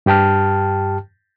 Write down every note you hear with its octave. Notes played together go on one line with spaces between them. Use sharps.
G2 G4 G5 A5 F6